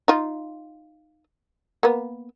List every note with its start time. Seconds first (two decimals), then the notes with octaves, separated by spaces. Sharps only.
0.08 D#4 F4
1.83 A#3 B3